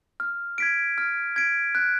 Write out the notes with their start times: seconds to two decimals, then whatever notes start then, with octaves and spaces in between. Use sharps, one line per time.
0.20 F6
0.58 G#6 B6 D7
0.98 F6
1.36 G#6 B6 D7
1.75 F#6